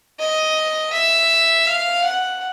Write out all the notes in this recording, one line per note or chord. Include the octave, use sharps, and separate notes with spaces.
D#5
E5
F5
F#5